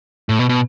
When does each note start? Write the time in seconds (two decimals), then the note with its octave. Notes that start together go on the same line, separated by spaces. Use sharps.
0.29 A2
0.39 B2
0.49 B2